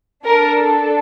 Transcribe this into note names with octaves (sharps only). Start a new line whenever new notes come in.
D4 A4 A#4